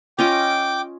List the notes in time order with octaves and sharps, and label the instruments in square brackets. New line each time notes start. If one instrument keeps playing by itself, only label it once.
[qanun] C#4 F4 D#5 [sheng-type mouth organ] G5 D6